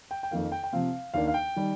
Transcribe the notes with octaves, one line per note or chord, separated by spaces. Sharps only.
G5
G5
F2 D#3 A#3 F5
G5
G5
C3 F3 C4 F5
D#2 D#3 A#3 D4 F5
F5
G5
D#3 G3